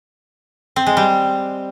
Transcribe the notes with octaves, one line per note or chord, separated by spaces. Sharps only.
C4
G#3
G3